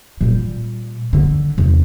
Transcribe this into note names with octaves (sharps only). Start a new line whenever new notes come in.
A#2 G3
D3
E2 C3